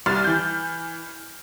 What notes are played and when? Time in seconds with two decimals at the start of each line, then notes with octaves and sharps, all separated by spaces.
0.06 C2 F6 A6
0.24 E3 G6